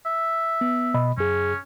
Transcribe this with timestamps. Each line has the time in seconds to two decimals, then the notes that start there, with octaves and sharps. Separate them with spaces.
0.06 E5
0.61 B3
0.94 B2 D#5 B5
1.18 F#2 C#4 G#4